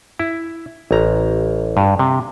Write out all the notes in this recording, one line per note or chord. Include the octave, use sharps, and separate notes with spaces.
E4
A1 A#5
G2
C3